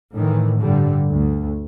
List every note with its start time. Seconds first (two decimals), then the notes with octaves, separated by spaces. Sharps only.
0.14 A2 D#3 E3
0.59 G2 D3 G3
1.11 D2